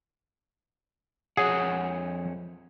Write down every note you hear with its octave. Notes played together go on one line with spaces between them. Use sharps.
F2 G#4 C#5 F#5